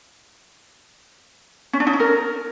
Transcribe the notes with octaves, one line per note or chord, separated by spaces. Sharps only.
C#4
D4
D#4
C#4
A#4